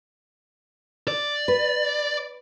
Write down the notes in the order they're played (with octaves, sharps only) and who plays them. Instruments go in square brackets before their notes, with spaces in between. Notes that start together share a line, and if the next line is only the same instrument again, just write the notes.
[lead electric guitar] D5
[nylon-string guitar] B4